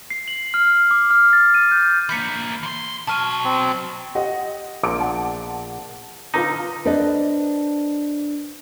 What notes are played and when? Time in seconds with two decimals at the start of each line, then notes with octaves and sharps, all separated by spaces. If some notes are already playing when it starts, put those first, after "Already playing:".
0.10 C7
0.28 F#7
0.54 F6
0.91 D6
1.11 F6
1.33 A6
1.54 D#7
1.71 G6
2.09 E3 A#3 G6 B6 C#7
2.63 E3 C6
3.07 B2 F#3 A5 F6 D#7
3.45 C4
4.15 G4 D#5 F#5
4.83 A#1 A#2 D6 D7
5.00 F#5 A5
6.34 D3 D#4 F4 B4 A#5
6.85 D4 B4 C5 D5 D#5